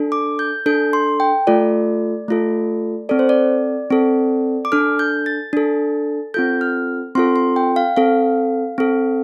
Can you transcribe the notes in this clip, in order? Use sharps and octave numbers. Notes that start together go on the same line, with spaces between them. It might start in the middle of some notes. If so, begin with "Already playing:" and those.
Already playing: D4 A4
D6
G6
D4 A4 G6
C6
G5
A3 F4 A4 D5
A3 F4 A4
C4 A4 D5
C5
D5
C4 A4
D6
D4 A4 F6
G6
A6
D4 A4
C4 F4 A4 G6
F6
C4 F4 A4 C6
C6
G5
F5
C4 A4 F5
C4 A4